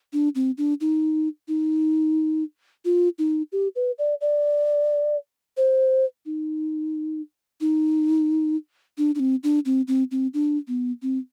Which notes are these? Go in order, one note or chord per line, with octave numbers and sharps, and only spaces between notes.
D4
C4
D4
D#4
D#4
F4
D#4
G4
B4
D5
D5
C5
D#4
D#4
D4
D4
C4
D4
C4
C4
C4
D4
B3
C4